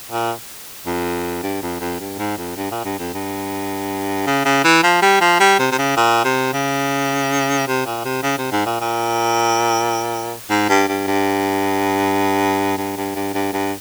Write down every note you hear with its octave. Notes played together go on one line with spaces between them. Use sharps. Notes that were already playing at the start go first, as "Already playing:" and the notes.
A#2
F2
G2
F2
F2
G2
G#2
F2
G2
A#2
G2
F2
G2
C#3
C#3
E3
F3
G3
F3
G3
C3
C3
C#3
A#2
C3
C#3
C3
A#2
C3
C#3
C3
G#2
A#2
A#2
G#2
G2
G2
G2
G2
G2
G2
G2
G2